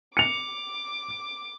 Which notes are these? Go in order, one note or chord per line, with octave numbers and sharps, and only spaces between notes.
D6 C#7 F7